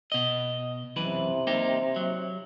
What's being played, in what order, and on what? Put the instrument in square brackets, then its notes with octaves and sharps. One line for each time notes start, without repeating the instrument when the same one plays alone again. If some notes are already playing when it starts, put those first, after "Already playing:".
[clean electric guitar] B2 D#5
[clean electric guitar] F#2 E3 B4 [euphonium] C3
[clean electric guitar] A#3 D#4 G4
F#3